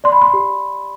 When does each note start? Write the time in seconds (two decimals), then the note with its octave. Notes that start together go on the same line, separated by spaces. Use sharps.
0.04 D5 C6
0.12 B5
0.22 C6
0.33 G4